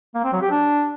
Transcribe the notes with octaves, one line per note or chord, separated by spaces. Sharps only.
A#3
C4
F#3
G4
D4